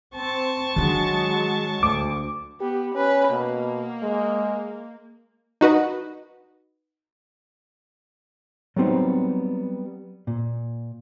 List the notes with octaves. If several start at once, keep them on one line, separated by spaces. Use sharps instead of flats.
C4 A5 C#6
D#3 F#3 G#3 D4
D2 D6
B3 G4
C#4 B4
B2 A#3
G#3
D#4 F#4 B4 D#5
F#3 G3 B3 C4 D#4
A#2